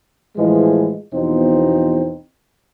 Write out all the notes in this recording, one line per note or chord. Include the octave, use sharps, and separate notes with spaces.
A2 E3 F3 G#3
E2 B2 F3 C4 D#4